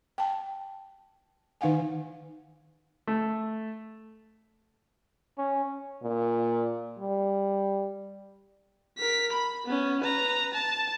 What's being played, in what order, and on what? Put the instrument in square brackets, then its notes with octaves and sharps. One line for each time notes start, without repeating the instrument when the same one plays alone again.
[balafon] G5 A5
D#3 D#4 F5 F#5 G#5
[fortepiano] A3
[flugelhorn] C#4
[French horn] A#2
G3
[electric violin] A#4 B6
B5
B3 C#4
B4 A#5
A5